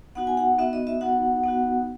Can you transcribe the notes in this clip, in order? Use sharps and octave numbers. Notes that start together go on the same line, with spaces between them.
B3 D#4 F#4 F#5
G#5
F#5
B3 D#4 F#4 E5
D#5
E5
B3 D#4 F#4 F#5
B3 D#4 F#4